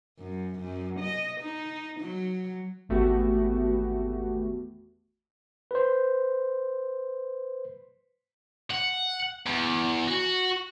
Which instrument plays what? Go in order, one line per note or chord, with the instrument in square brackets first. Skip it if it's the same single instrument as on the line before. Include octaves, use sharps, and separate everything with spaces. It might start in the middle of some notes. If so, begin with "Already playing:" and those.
[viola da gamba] F#2
F#2
D#5
D#4
F#3
[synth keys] G#1 E2 A3 B3 F#4 G4
[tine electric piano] B4 C5
[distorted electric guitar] F#5
E2
F#4